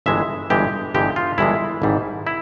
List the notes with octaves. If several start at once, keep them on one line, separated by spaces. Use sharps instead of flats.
G1 G2 E3 G#3 E5
G1 G2 E3 G#3 G4
G1 G2 E3 G#3 G4
F4
G1 G2 E3 G#3 E4
G#1 G#2 G3
E4